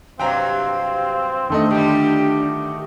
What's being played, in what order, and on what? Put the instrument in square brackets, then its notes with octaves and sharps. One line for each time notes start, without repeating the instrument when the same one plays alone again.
[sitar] G2 C3 F#3 [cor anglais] C4 [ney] F5 [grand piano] G5 A#5
[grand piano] D#3 A3 D#5 [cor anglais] C4 [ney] D4
[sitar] A#2 D3 G3 [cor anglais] G4